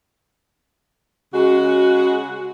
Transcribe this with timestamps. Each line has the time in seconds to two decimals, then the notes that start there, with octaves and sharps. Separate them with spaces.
1.34 C#3 G#3 F#4